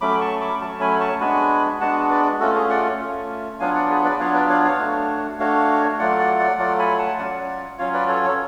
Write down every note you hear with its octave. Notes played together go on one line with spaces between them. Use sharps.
F#3 A3 C#4 B5 D6
A5 C#6
B5 D6
F#3 A3 C#4 A5 C#6
G#5 B5
A5 C#6
G#3 B3 D4 F#4 G#5 B5
G#3 B3 D4 F#4 F#5 A5
B4 D5
A3 C#4 F4 F#4 A4
G#4
D5 F#5
A3 C#4 F4
F#3 B3 D4 F4 F5 G#5
D5 F#5
G#4 B4
B4 D5
F#3 B3 D4 F4 C#5 F5
B4 D5
C#5 F5
C#5 F5
A3 D4 F#4
A3 D4 F#4 C#5 F5
F#3 A3 F4 D5 F#5
D5 F#5
D5 F#5
F#3 A3 F4 D5 F#5
G#5 B5
F#5 A5
F#3 C#4 F4 D5 F#5
F#3 C#4 F4 C#5 F5
B4 D5
A4 C#5
A4 C#5